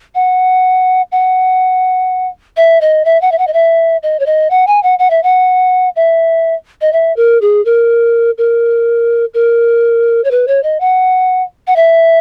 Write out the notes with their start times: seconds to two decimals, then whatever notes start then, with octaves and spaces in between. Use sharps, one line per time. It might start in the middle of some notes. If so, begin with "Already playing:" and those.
0.15 F#5
1.12 F#5
2.57 E5
2.81 D#5
3.05 E5
3.21 F#5
3.32 E5
3.38 F#5
3.47 D#5
3.53 E5
4.03 D#5
4.20 C#5
4.26 D#5
4.50 F#5
4.67 G#5
4.83 F#5
4.99 F#5
5.10 E5
5.23 F#5
5.96 E5
6.81 D#5
6.93 E5
7.16 A#4
7.41 G#4
7.65 A#4
8.38 A#4
9.34 A#4
10.24 C#5
10.31 B4
10.48 C#5
10.63 D#5
10.80 F#5
11.67 F#5
11.76 E5